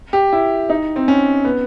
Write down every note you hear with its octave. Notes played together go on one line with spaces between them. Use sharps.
G4
E4
D#4
C4
C#4
B3